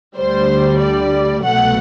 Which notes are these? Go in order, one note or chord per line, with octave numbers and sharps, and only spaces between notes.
D2 D3 G3 C5
D5
C2 B2 F#3 A3 F#5